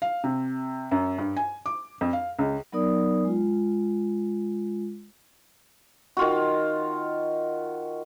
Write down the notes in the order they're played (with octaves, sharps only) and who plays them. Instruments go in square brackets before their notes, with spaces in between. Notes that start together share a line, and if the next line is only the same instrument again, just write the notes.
[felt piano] F5
C3
F#2
G2
G#5
D6
F2
F5
C#2
[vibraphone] F#3 B3 D#4 A#4 D5 D#6
G#3 F4
[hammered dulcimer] D#3 F4 F#4